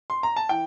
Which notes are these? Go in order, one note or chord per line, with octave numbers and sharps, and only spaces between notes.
C6
A#5
A5
E3 G5